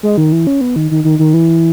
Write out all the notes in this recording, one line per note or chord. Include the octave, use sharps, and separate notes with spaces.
G#3
D#3
E3
C#4
B3
D#3
D#3
D#3
D#3
E3